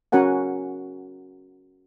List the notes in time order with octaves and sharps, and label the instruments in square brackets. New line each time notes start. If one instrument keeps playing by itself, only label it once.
[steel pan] C#4 F#4 A#4 F#5 G#5